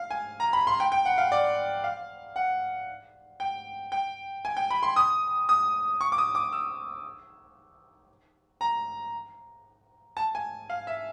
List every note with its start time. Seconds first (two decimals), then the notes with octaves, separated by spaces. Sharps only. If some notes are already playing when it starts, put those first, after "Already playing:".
Already playing: F5
0.11 G#5
0.40 A#5
0.53 B5
0.67 C6
0.80 G5
0.92 G5
1.05 F#5
1.18 F5
1.32 D5
1.84 F5
2.36 F#5
3.40 G5
3.92 G5
4.45 G#5
4.57 G5
4.70 B5
4.83 C6
4.96 D#6
5.49 D#6
6.01 C#6
6.12 D6
6.18 D#6
6.35 D6
6.52 E6
8.61 A#5
10.17 A5
10.35 G#5
10.70 F5
10.87 E5